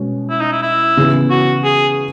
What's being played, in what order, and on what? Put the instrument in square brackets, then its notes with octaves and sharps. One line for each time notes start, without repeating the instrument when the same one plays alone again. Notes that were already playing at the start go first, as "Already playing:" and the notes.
Already playing: [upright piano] B2 G#3 C#4
[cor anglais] E4
D#4
E4
E4
[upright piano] C#3 E3 B3
[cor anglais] F#4
G#4